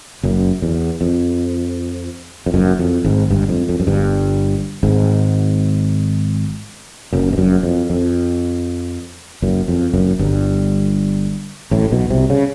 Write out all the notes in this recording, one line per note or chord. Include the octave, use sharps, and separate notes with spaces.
F#1 F#2
E2
F2
F2
F#1 F#2
F2
G#1 G#2
G1 G2
F2
F2
F#2
G1 G2
G#1 G#2
F#1 F#2
G2
F#1 F#2
F2
F2
F#1 F#2
F2
F#1 F#2
G1 G2
A1 A2
B1 B2
C2 C3
C#3